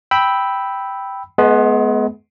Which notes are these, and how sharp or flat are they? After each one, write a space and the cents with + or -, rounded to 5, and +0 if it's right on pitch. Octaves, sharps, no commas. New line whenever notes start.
G5 +0 B5 +0 E6 -10
G#3 +35 B3 +0 D#5 +0